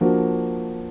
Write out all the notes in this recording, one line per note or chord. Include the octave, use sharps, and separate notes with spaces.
F3 A#3 D4 F#4